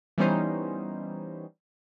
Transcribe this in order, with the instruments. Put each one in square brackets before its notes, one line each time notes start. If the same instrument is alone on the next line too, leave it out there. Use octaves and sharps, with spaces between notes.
[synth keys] E3 G3 B3 C#4 D#4 C5